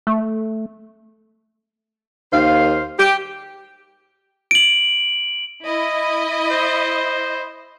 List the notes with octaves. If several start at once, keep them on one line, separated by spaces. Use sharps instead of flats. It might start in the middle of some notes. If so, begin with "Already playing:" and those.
A3
D#2 D#3 C5 F5
G4
D7 F#7
E4 D#5
C5